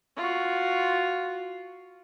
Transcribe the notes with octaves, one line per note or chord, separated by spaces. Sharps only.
F4 F#4